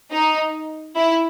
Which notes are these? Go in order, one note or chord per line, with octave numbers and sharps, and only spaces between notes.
D#4
E4